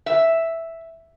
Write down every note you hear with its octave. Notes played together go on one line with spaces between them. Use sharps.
E5